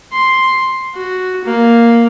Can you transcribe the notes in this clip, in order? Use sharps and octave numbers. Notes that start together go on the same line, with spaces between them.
C6
F#4
A#3